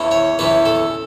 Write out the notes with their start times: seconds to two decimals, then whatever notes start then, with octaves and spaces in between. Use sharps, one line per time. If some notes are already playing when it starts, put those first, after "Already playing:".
Already playing: E2 E3 C#4
0.11 C#5
0.39 E2 E3 C#4 B4
0.65 A4